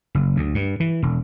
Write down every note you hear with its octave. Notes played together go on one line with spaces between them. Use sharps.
F#1
D2
G2
E3
E1